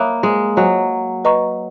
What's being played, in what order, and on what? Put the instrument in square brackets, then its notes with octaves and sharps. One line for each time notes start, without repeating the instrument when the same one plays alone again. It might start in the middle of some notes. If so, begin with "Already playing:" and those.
Already playing: [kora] A#3 [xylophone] C#5 E5 B5 D#6 F#6
[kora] G#3
[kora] F#3 [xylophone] D#5 G#5 D#6 F#6
[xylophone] B4 D#5 A#5 C#6